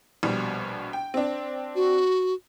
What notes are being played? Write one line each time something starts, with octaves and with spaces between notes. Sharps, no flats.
A#1 B2 G3
G5
C4 D4
F#4